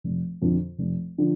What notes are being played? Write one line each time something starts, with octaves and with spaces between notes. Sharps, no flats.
F1
F2 D3 F3
F1
D3 F3